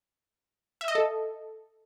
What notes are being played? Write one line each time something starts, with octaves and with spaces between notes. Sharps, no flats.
E5
D#5
A4